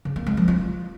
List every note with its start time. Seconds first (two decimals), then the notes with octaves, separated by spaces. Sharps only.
0.05 C#3
0.16 A#3
0.27 G#3
0.37 F3
0.48 F4